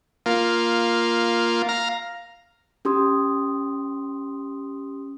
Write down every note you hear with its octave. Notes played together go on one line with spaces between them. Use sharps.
A#3 F4
F5 A#5
C#4 G4 C6 D#6